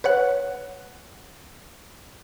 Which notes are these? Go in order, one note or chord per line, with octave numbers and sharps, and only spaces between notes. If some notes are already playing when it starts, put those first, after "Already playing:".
B4 C#5 F#5 F#6